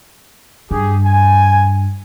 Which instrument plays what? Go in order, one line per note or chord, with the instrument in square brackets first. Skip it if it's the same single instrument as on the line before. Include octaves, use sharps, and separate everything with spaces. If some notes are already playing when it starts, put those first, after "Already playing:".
[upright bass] G2 [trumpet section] G4 G#4
[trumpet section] G#5